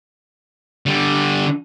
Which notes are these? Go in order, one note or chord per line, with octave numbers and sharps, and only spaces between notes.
D3 G3